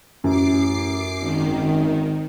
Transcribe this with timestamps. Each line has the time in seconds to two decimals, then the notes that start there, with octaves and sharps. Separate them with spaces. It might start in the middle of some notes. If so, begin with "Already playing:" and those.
0.24 A1 F#2 D6 C7
1.22 G#1 D#3